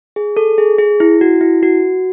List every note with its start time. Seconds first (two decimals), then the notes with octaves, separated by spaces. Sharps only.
0.16 G#4
0.37 A4
0.58 G#4
0.79 G#4
1.00 E4
1.21 F#4
1.41 E4
1.63 F#4